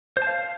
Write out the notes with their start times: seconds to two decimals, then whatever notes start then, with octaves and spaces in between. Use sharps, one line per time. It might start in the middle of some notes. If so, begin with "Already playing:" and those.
0.17 C5
0.22 A5
0.27 F5